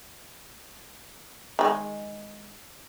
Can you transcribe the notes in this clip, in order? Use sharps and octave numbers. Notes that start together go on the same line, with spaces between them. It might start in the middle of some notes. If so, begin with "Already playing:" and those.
D#3 G#3